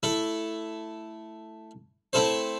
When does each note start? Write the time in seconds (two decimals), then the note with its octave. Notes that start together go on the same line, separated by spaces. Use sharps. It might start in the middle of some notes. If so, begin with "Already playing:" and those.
0.03 A3 E4 A4
2.13 A3 C4 E4 A4 C5